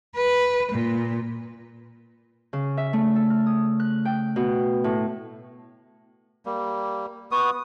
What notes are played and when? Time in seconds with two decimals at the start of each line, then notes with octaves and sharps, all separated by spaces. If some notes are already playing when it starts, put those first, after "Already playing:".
0.16 B4
0.72 A#2
2.53 C#3
2.77 E5
2.93 A3
3.16 A4
3.30 F6
3.46 D#6
3.80 F#6
4.05 G5
4.36 B2
4.84 A2
6.45 G3 A#3
7.31 B3 F#4 D#6